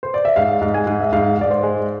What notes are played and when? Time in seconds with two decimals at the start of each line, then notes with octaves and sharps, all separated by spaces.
0.03 C5
0.14 D5
0.25 E5
0.36 G#2 F5
0.61 G#2
0.74 G#5
0.87 G#2
1.00 E5
1.13 G#2 F5
1.38 G#2 D5
1.50 C5
1.63 G#3